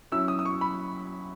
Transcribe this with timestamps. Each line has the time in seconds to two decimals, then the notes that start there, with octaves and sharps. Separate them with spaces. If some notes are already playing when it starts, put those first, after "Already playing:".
0.12 F#3 C#4 E4 E6
0.28 D#6
0.39 D#6
0.45 C#6
0.61 B5